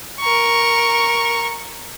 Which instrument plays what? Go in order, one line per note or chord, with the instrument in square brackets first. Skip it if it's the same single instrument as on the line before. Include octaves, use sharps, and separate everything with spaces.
[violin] A#4 C#6